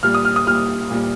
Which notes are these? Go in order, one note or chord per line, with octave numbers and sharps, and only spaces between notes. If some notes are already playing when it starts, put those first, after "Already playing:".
A#2 G3 F6
D#6
F6
D#6
A#2 G3 F6
A#2 G3